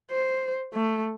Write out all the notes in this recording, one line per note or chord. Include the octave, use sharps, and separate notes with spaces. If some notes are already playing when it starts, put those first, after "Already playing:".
C5
A3